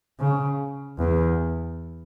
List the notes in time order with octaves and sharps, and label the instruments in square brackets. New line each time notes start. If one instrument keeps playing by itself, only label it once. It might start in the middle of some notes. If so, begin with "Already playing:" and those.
[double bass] C#3
E2